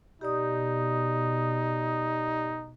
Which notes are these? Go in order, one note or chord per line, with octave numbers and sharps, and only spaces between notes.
B2 D#4 G4 D5 D#6